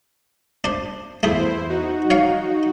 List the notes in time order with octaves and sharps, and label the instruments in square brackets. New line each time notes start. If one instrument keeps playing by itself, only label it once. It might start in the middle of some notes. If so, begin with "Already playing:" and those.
[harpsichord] D4 C5
[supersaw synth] E2 E4 C5 [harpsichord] A3 G#4
[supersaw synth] D#4 F#4
[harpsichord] C#5 F5 C#6